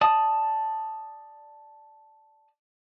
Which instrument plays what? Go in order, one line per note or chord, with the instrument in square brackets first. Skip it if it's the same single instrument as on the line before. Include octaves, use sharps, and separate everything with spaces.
[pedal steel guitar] D5 A5 D#6